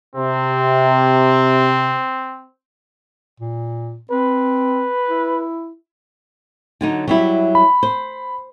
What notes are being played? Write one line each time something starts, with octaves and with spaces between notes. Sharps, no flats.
C3 C4
A#2
C4 B4
E4
D3 F#3 D#4
F#3 G3 E4
B5
C5